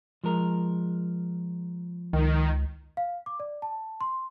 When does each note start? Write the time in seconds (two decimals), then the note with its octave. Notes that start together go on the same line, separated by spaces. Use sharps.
0.24 F3 G#3 A#4
2.13 C#2 D#3
2.97 F5
3.26 D6
3.40 D5
3.62 A5
4.01 C6